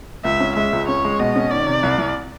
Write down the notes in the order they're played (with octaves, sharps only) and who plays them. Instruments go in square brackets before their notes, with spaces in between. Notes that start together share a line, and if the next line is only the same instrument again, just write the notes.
[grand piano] C#2 [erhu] E5
[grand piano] C#4
[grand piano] G#3 [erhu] E5
[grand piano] C#2
[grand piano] C#4 [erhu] C#5
[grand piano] G#3
[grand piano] B2 [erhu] D#5
[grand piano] C#4
[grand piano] D#3 [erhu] D5
[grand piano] C3
C2
C2